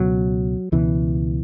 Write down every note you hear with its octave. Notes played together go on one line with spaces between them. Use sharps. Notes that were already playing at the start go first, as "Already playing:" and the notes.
Already playing: C#2 B2 F#3
C#2 B2 E3